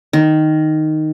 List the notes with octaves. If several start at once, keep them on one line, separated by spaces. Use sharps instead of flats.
D#3